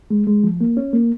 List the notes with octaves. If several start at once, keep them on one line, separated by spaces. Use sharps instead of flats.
G#3
G#3
F3
A#3
C#4
A#3